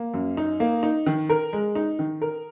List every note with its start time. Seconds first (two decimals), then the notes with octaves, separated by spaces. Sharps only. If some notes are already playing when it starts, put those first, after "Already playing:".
Already playing: A#3
0.14 F#2
0.37 D#4
0.60 A#3
0.83 D#4
1.06 D#3
1.30 A#4
1.53 G#3
1.75 D#4
1.99 D#3
2.22 A#4